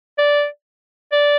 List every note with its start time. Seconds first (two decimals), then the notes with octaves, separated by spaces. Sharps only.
0.18 D5
1.12 D5